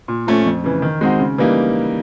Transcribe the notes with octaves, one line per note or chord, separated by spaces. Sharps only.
A#2
F3 A3 C#4
F2
C#3 E3
D#3
G#3 C4 D#4 F#4
C#3
E3 G3 A#3 D#4